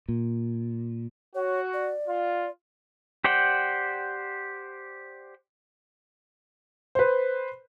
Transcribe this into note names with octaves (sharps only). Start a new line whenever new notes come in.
A#2
F#4 C#5
D5
F4
G4 C5 D5 F#5 G5
B4 C5